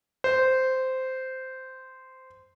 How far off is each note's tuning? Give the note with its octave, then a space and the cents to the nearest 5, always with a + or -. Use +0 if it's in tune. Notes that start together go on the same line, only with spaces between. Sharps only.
C5 -10